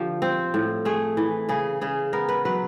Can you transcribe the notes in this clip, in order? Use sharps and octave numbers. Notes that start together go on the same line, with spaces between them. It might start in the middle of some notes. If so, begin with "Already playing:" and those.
Already playing: D3 F3 G4
C4
A2
A3 G#4
E3
C#3 G#4
C#3 G#4
B3 A#4
B4
F#3 B4